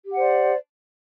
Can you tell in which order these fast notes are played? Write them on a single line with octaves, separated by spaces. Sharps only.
G4 F#5 C5 D5